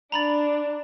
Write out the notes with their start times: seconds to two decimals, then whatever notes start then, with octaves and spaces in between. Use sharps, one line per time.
0.12 D4 A#5 B5 A6